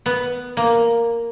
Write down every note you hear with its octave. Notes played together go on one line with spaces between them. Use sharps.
B3
A#3